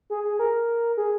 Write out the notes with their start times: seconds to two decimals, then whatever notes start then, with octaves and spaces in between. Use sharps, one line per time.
0.10 G#4
0.24 G#4
0.39 A#4
0.97 G#4